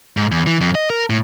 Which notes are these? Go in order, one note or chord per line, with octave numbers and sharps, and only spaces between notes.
G#2
E2
E3
F2
D#5
A#4
A2